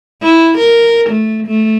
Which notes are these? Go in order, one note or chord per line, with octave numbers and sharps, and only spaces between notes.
E4
A#4
A3
A3